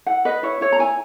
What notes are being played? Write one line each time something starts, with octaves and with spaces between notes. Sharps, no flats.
E4 F#5
B4 D#5
E4 C#5
E4 C#5
A#5
E4 G#5